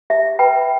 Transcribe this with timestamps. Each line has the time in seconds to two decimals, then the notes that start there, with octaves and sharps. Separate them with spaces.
0.10 G4 E5
0.39 B4 G5 B5